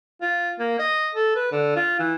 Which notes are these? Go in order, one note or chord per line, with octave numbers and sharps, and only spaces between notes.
F4
A#3
D#5
A4
B4
D3
F4
E3